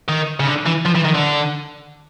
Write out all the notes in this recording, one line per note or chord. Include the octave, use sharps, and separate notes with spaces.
D#3
C#3
D3
E3
F3
E3
D#3
D3